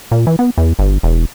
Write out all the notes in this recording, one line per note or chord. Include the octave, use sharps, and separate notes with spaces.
A#2
E3
B3
E2
G1
E1